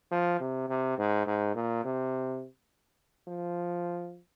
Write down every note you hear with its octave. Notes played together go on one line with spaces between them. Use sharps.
F3
C3
C3
G#2
G#2
A#2
C3
F3